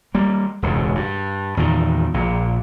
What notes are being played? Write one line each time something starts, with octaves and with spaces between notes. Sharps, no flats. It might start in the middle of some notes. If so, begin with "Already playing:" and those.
G3 A#3
E1 C#2 G#2 C3
G2
E2 A#2 D#3
A#1 A#2